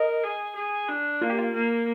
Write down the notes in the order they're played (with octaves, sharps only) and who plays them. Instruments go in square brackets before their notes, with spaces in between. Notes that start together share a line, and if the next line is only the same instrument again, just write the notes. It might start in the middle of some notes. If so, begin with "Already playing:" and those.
Already playing: [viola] A#4 [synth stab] D#5
[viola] G#4
G#4
D4
[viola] A#3 [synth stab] F4
[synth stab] G4
F4
[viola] A#3